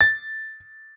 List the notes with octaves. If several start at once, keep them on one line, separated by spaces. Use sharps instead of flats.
A6